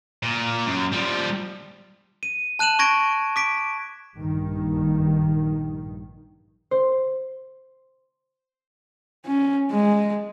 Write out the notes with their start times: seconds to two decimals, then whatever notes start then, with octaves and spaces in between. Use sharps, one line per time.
0.23 A#2
0.66 F#2
0.92 F3 G3
2.23 D#7
2.59 A5 F#6 D#7 E7 F#7
2.79 C#6 G#6 A#6 D7
3.36 D6 B6 D7
4.15 A#1 G2 D#3
6.71 C5
9.26 C#4
9.72 G#3